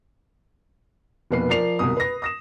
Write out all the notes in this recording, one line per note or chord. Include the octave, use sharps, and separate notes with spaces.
F1 B2 A#3 B4 C7
F3 A#4 D5 C7 F7
F#1 C2 B2 D#6
B4 A#6
D#6 A#6 E7